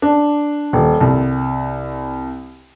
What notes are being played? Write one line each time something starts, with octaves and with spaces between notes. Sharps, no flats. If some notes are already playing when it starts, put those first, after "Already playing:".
D4
D#1
C2